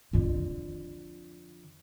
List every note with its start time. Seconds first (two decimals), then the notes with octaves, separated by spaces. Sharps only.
0.13 F2 D3